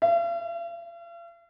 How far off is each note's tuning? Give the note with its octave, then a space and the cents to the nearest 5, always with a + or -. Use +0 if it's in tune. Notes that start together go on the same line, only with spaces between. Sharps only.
F5 -45